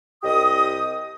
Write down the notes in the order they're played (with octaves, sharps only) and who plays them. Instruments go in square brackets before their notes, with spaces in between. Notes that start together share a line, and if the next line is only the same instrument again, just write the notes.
[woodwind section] C2 G4 D#5 D#6